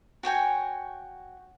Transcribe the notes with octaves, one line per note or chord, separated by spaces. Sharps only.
F#4 C#5 G5 G#5